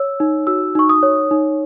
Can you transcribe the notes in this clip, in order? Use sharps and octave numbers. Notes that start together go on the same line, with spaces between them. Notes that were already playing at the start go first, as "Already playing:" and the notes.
Already playing: C#5 E6
D#4
F#4 E6
D#4 C#6
D#6
C#5
D#4